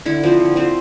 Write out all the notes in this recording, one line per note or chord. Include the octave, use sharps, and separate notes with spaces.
D3 E4
F3 C4
D3
F3 C4